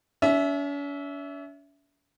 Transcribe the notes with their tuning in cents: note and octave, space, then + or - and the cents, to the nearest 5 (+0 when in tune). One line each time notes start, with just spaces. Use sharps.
C#4 +45 E5 +0